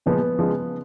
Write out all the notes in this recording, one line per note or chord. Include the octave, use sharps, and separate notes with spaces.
A#2 F3 G#3 B3
C#3 F3 G#3